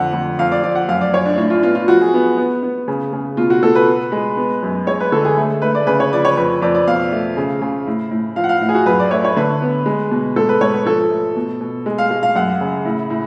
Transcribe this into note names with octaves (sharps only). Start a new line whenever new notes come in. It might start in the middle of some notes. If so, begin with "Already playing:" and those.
Already playing: F2 D3 F#5
F2
F2 F5
D5
F3 D5
F#5
F#2 F5
D5
F#2 C#5
D4
A2 D4
F4
B3 F4
F4
F3 F#4
G#4
B3
B3
B3
C#3
C#3
B2 F4
F#4
B2 A4
B4
B3
G#3
B3
F#2
G#3 C#5
B4
D3 A4
G#4
A3
A3 B4
D5
C#3 B4
C#5
F3 D5
C#5
F2 B4
F2 D5
D5
B2 F5
A3
C#3
C#3
A2
A2
F3 F5
F#5
F5
A2
G#4
F#4
F#2 B4
D5
A3 C#5
C#5
D3 B4
B3
G#3
B2
G#2 A4
B4
G#2 C#5
B4
F3 A4
A3
B2
B2
G#3
F5
G#3 F5
F5
F#2 F#5
C#3
A2
A2